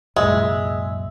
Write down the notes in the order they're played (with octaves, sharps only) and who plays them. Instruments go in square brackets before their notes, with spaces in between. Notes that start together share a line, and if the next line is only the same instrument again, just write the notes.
[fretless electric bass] C2 F#2 A#2 [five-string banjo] G#3 [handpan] E5